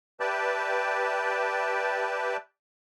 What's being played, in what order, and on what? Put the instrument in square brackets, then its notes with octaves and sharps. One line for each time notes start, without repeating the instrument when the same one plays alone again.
[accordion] G4 B4 D5 E5 G5 A5